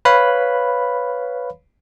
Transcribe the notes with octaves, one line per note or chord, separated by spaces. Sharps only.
B4 C#5 F5 B5